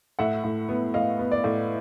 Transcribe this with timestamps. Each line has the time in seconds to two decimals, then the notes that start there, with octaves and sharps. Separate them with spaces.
0.19 A2 E5 F#5
0.44 A2
0.69 B3
0.94 A2 D#5 F5
1.19 B3
1.31 D5
1.44 A2